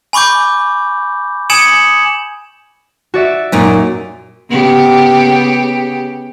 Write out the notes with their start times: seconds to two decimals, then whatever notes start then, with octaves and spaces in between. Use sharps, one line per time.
0.13 G#5 B5 C#6 D6 G6
1.50 G#5 D#6 G#6 C#7 E7 F#7
3.14 F#4 D5 E5
3.52 F#2 A#2 D#4
4.50 C#3 B3 G4